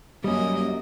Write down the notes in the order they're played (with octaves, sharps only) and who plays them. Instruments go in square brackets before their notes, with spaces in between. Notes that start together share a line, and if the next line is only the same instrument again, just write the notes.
[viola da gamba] F#2 A#3 D#5 [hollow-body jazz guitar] G3 C#4